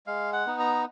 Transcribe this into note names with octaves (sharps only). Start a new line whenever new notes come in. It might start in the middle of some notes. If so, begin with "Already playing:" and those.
G#3 F5
F#5
B3 D#4
A#5